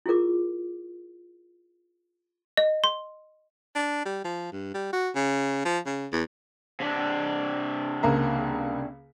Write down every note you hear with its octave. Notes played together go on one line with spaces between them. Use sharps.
E4 F4 G#4 A#4 D6
D#5
C6
D4
G3
F3
G2
G3
F#4
C#3
F3
C#3
E2
C3 D4
C#2 A#3 A#5